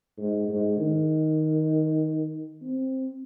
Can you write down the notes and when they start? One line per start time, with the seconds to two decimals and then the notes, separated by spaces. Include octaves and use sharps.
0.18 G#2
0.48 G#2
0.79 D#3
2.62 C4